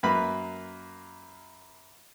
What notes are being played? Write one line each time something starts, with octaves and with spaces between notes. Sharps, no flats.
F#2 A#3 B4 B5